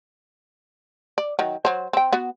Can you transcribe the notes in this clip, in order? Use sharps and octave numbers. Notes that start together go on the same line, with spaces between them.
D5
D#3 F#3
F#3 C5
C4 G5
B3 F#4